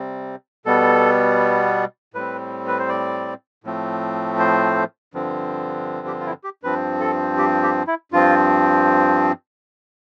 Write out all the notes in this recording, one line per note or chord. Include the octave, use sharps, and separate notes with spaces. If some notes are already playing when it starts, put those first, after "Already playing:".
Already playing: C3 G3 C4
B2 G3 B3 A4
A2 G3 C4 B4
B4
C5
D5
A2 F3 A3 C4
C5
G2 D3 F3 C4
G4
F4
E4
G4
G2 F3 C4 B4
A4
G4
G4
E4
G2 F3 C4 F4